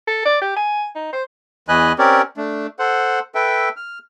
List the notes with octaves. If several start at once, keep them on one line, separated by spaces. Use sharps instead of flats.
A4
D5
G4
G#5
D#4
C5
E2 E3 B4 D#5 G#5 F#6
C4 C#4 G4 A#4 C#5 D5
A3 D4
A4 C5 F#5
A4 B4 E5 G5
F6